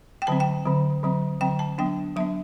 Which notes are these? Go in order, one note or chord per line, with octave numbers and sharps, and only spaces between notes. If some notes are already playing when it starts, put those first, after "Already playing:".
G5
D3 F#3 C4 A5
G5
D3 F#3 C4
D3 F#3 C4
D3 F#3 C4 G5
A5
F#3 B3 D4 G5
F#3 B3 D4 E5